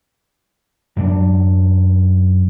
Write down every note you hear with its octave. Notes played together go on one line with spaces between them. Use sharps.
F#2 F#3 G3 D4